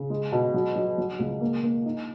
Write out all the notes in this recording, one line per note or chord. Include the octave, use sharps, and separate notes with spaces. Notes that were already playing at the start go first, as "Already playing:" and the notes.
Already playing: C#3
G#3
B2
F#3
F#3
F#3
C#2
A#3
A#3
D#4